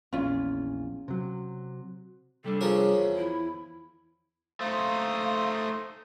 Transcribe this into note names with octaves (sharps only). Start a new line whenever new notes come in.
A#1 E2 C#4 F4
C3 F#3
C3 G3 D4 A4
F3 C#4 G#4 A#4
E2
E4
A3 D#4 C5 F5 C6 D#6